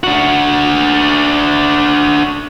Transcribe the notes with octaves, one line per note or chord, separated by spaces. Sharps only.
D4 F#4